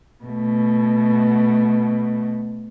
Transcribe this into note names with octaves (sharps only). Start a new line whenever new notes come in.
B2 A3